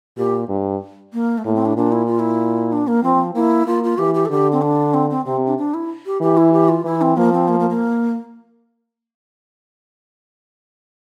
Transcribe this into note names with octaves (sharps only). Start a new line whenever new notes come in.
A#2 G4
G2
A#3
A3
A2 A#3
C4
D4
A#2 D4
E4
F4
E4
D4
A#3
F3 C4
A#3 E4
A#3 F4
F4
E3 G4
G4
A4
D3 G4
C4
D4
C4
C4
C3 C4
D4
D4
E4
G4
E3 G4
E4
G4
F4
E3 E4
C4
F3 A#3
C4
A#3
A#3
A#3